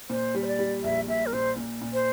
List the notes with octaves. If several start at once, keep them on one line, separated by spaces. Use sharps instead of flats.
A#2 C5
G3
C5
D5
G3
A#1 E5
A#2 E5
A#4
A#2 C5
A#2
A#2
C5